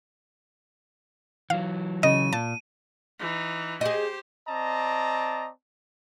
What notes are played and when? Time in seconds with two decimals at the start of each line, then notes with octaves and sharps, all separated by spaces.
1.50 E3 F#3 F5
2.03 C#3 D#5 D#7
2.33 A#2 A5
3.20 E3 D#4
3.81 G4 G#4 C5 D#5
4.48 C4 D5 D#5 A5 A#5